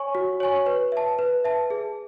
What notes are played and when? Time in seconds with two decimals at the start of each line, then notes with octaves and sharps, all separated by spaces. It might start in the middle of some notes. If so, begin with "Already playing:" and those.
Already playing: C#5 G#5 C#6
0.15 F#4
0.40 C#5 G#5 C#6
0.66 B4
0.92 E5 A5
1.19 B4
1.44 E5 A5
1.70 G#4